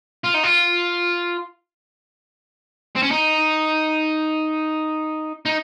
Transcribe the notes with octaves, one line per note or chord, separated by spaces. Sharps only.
F4
D#4
F4
C4
C#4
D#4
D#4